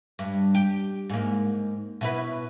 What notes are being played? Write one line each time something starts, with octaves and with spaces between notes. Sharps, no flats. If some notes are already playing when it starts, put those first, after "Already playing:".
G2
G4
G#2 A#3
B2 E4 B4